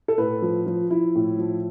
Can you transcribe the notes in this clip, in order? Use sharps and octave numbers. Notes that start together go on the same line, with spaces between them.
A4
A2 B4
F3
F3
F3 E4
A2
F3